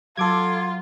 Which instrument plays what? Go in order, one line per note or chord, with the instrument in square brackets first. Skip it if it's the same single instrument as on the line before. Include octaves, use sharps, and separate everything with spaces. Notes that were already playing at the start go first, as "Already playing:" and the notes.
[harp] F#3 [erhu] F4 [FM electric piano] A4 D6 G#6